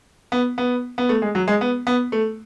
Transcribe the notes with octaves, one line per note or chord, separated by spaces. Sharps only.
B3
B3
B3
A3
G#3
F#3
G#3
B3
B3
A3